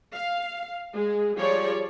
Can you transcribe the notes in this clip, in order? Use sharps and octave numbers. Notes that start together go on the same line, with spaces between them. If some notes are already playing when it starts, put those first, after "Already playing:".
F5
G#3 G#4
F3 G3 G#4 C#5 D5